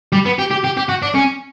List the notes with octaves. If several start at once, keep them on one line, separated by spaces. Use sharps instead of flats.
G3
B3
G4
G4
G4
G4
F#4
D4
C#4